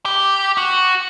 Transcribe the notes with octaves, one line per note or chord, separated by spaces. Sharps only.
G4
F#4